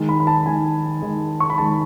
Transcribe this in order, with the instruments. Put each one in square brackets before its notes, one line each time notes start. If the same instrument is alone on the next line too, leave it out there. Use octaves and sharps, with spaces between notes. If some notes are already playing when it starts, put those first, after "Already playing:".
Already playing: [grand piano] D#3 G#3
B5
B5
A5
D#3 G#3 G#5
D#3 G#3
C#6
B5
D#3 G#3 A5